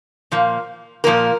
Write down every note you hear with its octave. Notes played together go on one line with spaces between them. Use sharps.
A#2 F3 A#3
A#2 F3 A#3 A#4